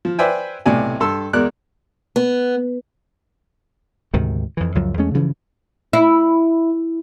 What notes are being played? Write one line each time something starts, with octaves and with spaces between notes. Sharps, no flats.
F3
B4 C5 D5 E5 G5 G#5
B1 A2 C3 D5 G#5
G2 A4 C6 E6
E2 G#3 A#4 D5 F#6
B3
D2 G#2 C3 D#3
F2 E3
C#2 F#2 F3 F#3
E2 G#3 A3 C#4
G2 C#3 E3 F3
E4